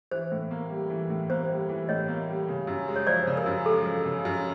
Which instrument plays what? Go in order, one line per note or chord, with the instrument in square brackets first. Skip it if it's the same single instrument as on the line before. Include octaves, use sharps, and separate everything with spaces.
[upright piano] E3 [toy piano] C5
[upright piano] A2
A#3
G3
E3
A2
[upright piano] A#3 [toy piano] C5
[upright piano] G3
E3
[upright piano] A2 [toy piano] C#5 D#5
[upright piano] A#3
G3
C#3
F#2
G#3
[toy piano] C#5
[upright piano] F3 [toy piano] C5 D5
[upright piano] C#3
[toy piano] A#4
[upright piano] F#2
[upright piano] G#3 [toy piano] A4
[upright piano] F3
C#3
F#2